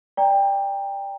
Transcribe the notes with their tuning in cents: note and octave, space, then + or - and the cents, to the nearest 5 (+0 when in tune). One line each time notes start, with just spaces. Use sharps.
D5 +0 G5 +20 A#5 +0